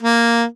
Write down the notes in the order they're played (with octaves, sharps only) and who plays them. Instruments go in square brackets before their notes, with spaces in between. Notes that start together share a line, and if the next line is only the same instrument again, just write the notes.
[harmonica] A#3